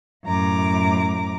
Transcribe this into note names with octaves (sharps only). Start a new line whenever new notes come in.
F#2 A2 A#5 D6